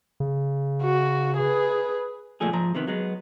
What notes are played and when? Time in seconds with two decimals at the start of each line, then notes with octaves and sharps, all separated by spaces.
0.20 C#3
0.82 F#4
1.37 G#4 B4
2.41 C#2 A#2 F3 A3 G#4
2.53 G#2 F3 A#5
2.75 C3 D#3 B3
2.87 F#3 G#3 B3